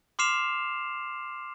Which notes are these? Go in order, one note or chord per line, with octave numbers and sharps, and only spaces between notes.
C6 D6 F6 C7 E7 F7